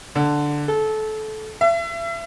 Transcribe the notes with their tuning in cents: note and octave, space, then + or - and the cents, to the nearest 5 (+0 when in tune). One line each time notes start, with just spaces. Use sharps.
D3 +0
A4 -25
E5 +35